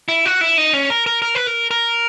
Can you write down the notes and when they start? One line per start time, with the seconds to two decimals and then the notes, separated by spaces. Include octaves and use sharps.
0.08 E4
0.25 F#4
0.41 E4
0.58 D#4
0.73 C#4
0.90 A#4
1.07 A#4
1.22 A#4
1.35 B4
1.47 A#4
1.71 A#4